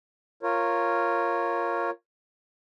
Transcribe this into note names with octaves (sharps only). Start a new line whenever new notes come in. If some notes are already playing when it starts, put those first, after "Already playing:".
F4 A#4 C#5